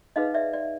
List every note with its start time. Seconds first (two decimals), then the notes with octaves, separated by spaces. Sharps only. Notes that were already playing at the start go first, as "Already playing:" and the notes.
0.16 D#4 G#4 B4 D#5 F5
0.34 D5 E5
0.53 D5